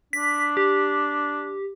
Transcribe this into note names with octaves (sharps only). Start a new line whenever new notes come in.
D4 B6
G4